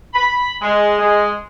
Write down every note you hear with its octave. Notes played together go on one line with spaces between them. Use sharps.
B5
G#3
G#3